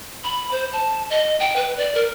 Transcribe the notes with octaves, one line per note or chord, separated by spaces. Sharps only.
B5
C5
A5
D#5
G5
B4
D5
A#4